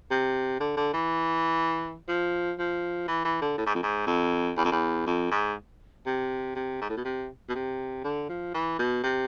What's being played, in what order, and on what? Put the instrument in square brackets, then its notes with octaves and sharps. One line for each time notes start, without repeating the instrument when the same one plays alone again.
[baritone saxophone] C3
D3
D3
E3
F3
F3
E3
E3
D3
A2
G#2
F2
G#2
F2
E2
F2
E2
F2
G#2
C3
C3
G#2
A2
B2
C3
B2
C3
D3
F3
E3
B2
C3